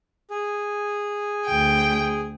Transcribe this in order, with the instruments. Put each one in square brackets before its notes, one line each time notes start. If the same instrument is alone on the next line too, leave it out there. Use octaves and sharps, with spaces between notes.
[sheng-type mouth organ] G#4
[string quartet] D2 G5